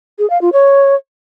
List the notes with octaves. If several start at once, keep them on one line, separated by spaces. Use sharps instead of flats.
G#4
F5
F4
C#5